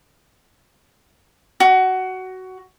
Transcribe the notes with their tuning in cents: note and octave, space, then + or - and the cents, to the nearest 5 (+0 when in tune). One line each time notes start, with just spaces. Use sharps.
F#4 +15